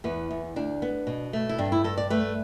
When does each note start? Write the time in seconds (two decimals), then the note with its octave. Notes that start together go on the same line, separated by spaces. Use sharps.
0.04 E2 B3
0.31 E2
0.56 D2 D4
0.82 B3
1.07 B2
1.33 A3
1.49 E4
1.58 G2 D4
1.72 E4
1.84 G2 A4
1.98 D5
2.10 A3 B4